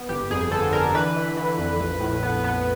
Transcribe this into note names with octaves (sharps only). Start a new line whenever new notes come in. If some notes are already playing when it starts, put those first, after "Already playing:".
Already playing: B3
G1 G4
F2 G#4
D3 A4
D3 A#4
E3 B4
E3
E3
F2
A#1
A2
B3
B3